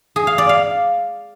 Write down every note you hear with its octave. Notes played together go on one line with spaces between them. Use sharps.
G#4
F5
D5
F5